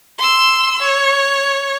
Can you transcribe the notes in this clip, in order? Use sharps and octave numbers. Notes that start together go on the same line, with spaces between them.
C6 E6
C#5